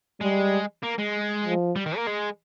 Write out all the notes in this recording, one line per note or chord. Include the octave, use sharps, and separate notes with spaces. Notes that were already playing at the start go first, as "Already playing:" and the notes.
G3 G#3
A#3
G#3
F3
G3
D#3
A#3
G#3